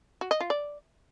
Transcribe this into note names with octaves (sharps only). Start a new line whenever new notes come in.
F#4
D#5
F4
D5